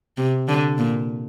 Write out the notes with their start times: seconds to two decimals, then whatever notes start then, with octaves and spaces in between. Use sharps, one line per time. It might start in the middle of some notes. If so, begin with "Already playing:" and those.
0.17 C3
0.48 D3
0.78 A#2